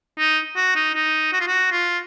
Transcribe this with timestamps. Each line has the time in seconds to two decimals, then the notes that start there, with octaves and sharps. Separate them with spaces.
0.18 D#4
0.56 F#4
0.76 D#4
0.95 D#4
1.33 F#4
1.40 F4
1.47 F#4
1.72 F4